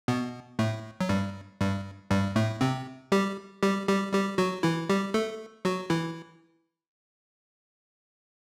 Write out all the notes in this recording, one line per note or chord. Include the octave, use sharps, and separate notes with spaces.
B2 B3
A2 A3
F#3
G2 G3
G2 G3
G2 G3
A2 A3
C3 C4
G3 G4
G3 G4
G3 G4
G3 G4
F#3 F#4
E3 E4
G3 G4
A3 A4
F#3 F#4
E3 E4